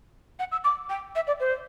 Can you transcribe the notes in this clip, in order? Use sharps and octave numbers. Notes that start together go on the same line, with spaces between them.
F#5
E6
D6
G5
E5
D5
C5